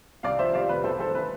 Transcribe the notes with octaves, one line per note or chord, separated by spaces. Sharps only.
C2 D5 F5
F3 C5 E5
G3 D5 F5
F1 B4
B1 A4 C5
E3 A4 C5
E3 B4